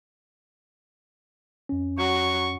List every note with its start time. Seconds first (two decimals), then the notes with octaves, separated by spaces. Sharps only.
1.69 F2 C#4
1.99 F#3 C#6